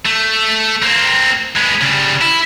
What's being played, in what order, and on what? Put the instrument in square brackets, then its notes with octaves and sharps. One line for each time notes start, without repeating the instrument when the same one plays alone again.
[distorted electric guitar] A3
A#3 C4
G#3 B3
C#3 G3
E4